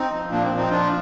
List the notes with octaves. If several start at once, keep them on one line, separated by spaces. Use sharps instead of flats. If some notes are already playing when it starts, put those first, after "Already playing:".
Already playing: C4 D#4
F3
A#2 A#3 D4
C4
F3
C4 D#4
F3 D4 F4